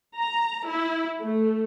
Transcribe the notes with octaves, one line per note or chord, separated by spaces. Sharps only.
A#5
E4
A3